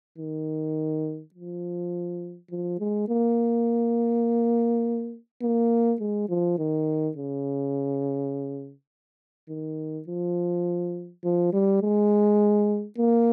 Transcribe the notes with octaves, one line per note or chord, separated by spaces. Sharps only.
D#3
F3
F3
G#3
A#3
A#3
G#3
F3
D#3
C#3
D#3
F3
F3
G3
G#3
A#3